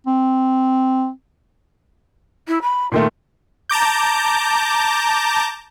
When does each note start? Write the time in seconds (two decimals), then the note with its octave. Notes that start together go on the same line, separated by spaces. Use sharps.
0.07 C4
2.48 E4
2.62 B5
2.92 A#2 D#3 A3 F4
3.70 A5 A#5 D6 G6